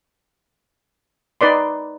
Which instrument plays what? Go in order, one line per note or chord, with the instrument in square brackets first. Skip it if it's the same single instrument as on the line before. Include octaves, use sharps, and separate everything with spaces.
[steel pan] D#4 B4 D5 C6